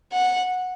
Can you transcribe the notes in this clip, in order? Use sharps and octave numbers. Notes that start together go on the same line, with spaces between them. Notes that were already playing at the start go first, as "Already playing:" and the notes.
F#5